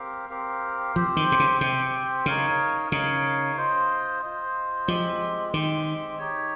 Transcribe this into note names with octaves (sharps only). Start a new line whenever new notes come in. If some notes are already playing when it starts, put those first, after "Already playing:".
Already playing: C4 G4 A#4 F5
C4 G4 A#4 F5
F3 C4 G4 C5
D#3
C3
C#3
C3 C4 G4 C5
C#3 D#4 A#4 C#5 F5
C#3 D#4 A#4 C#5 F5
F4 C5 D#5
F4 C5 D#5
F3 G#3 C4 G4
D#3 G#3 C4 G4
D#4 G4 C#5